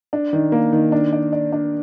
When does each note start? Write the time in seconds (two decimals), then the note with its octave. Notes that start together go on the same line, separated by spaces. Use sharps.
0.13 D4
0.33 D#3
0.52 A#3
0.73 D#3
0.92 D4
1.13 D5
1.33 D5
1.52 D4